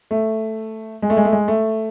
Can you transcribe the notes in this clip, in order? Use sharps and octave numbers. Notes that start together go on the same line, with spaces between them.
A3
G#3
A3
G#3
A3
G#3
A3